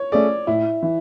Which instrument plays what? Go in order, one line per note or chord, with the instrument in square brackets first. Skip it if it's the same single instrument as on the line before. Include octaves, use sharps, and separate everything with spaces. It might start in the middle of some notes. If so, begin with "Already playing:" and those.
Already playing: [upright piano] C#5
[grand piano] A3 C#4 G#4 [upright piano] D5
[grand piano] A2 [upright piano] E4
[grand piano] E3